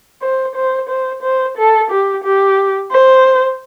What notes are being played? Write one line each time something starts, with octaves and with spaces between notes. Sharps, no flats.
C5
C5
C5
C5
A4
G4
G4
C5